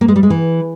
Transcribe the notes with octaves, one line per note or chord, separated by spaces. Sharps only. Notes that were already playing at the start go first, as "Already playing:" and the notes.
A#3
G#3
G3
G#3
E3